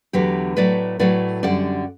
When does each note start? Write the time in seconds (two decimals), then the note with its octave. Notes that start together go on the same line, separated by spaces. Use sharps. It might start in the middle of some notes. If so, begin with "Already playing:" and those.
0.13 E2 D3 F#3 A3 G4 B4
0.56 A2 F#3 A3 B4 D5
0.99 A2 F#3 A3 B4 D5
1.43 F#2 D3 G3 D5 F#5